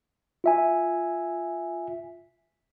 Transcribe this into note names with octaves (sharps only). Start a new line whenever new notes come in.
F4 E5 G#5